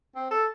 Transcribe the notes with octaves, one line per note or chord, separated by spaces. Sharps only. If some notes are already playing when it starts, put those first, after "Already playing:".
C4
A4